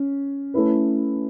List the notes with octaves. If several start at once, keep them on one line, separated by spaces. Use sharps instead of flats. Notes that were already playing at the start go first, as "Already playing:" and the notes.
Already playing: C#4
A3 C#4 E4 B4